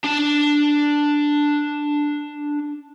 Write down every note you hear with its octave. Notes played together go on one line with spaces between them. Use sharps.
D4 A5